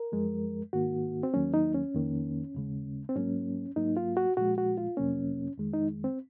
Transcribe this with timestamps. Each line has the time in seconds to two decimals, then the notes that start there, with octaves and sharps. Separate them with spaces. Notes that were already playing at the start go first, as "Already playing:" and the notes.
Already playing: A#4
0.12 F#2 F3 G#3
0.73 G#2 D#3 A#3 F#4
1.23 C4
1.33 D#2 D#3 F#3 A#3 C#4
1.54 D#4
1.74 C#4
1.94 F2 D#3 A#3
2.55 D#2 C#3 G#3
3.09 C4
3.16 G#2 F#3 A#3 C#4
3.76 G#2 F#3 A#3 D#4
3.97 F4
4.17 F#4
4.37 A#2 F3 G#3 F#4
4.58 F#4
4.78 F4
4.97 F2 C3 F#3 A#3 C#4
5.58 F2 D#3 G#3
5.73 D#4
6.04 C4